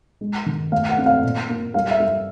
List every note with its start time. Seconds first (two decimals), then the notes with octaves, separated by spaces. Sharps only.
0.21 G#3
0.46 D#3
0.72 A3 F5
0.89 F#5
0.98 C4
1.06 F5
1.23 A#2
1.49 A#3
1.74 G3 F5
1.91 E5
2.00 G3